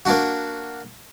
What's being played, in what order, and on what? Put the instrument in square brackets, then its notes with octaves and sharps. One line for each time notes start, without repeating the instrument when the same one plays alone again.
[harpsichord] A#3 D4 F#4